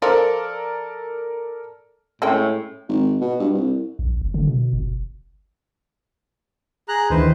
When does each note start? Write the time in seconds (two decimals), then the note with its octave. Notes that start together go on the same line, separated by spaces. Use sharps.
0.02 F3 A4 A#4 D5
2.22 A2 G#3 C#4 G5
2.89 G#1
3.21 B2
3.40 G2
3.54 C2
3.99 A#1
4.21 F#1
4.34 D3
4.47 B2
4.73 G1
6.89 G#4 A#5 F#6
7.10 D2 D#3 E3 B4 C5